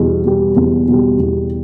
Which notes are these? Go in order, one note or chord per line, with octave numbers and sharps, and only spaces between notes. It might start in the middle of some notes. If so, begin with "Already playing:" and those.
Already playing: E2 B2 G3
B2 G3
E2
B2 G3
E2